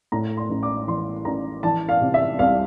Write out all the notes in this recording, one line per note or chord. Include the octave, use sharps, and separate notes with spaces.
A2 A#5
C6
A1
D6
E3 C6
A1 A#5
E3 A5
F5
C3
E5
C2 F5